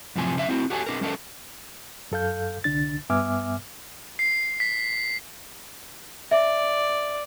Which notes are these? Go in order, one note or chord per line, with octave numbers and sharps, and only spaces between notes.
F#2 A2 C3 F3 G#5
F#2 C#3 F4 E5
C4 E4 F#4
F#4 G4 A4 C#5 G#5
C4 D4 G#4 A#4
G3 C#4 D4 A4 A#4 D#5
F#2 A4 F5 G6
C2 D3 D4 A6
G2 B3 E5 G#5 D6 F6
C7
B6
D5 E5